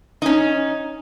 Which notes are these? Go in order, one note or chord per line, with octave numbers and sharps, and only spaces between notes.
C#4 D#4